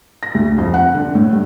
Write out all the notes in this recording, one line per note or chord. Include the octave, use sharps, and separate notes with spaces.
A#6
D2
F2
F#5
D3
A2
G2